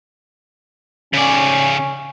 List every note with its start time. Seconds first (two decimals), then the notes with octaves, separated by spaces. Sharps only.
1.14 C#3 C#4 D5